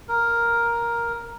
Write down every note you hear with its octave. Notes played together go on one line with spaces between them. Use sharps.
A#4